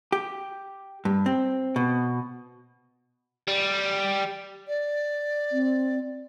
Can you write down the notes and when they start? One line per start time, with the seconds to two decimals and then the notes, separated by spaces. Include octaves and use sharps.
0.12 G4
1.05 G2
1.26 C4
1.76 B2
3.48 G3
4.68 D5
5.52 C4